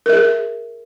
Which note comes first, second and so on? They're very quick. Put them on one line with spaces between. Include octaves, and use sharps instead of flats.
A#4 E5 G#4